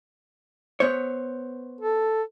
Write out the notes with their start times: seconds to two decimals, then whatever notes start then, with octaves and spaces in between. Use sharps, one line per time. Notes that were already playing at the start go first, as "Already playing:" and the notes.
0.80 B3 C5 C#5
1.80 A4